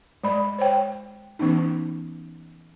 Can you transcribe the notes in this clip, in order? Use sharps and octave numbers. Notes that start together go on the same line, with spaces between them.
G#3 D5 B5
C5 C#5 G5
E3 B3 C#4 D#4